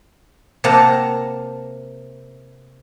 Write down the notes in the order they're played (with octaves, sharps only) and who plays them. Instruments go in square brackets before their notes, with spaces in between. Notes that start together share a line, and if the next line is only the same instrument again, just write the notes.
[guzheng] C3 A#3 F#5 A5 A#5